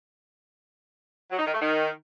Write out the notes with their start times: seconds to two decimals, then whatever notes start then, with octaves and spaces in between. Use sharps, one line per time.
1.31 F#3
1.39 D#4
1.46 D#3
1.53 A3
1.61 D#3